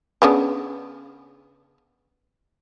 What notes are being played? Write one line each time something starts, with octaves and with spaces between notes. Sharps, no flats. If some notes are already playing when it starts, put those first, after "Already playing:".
C#3 B3 D4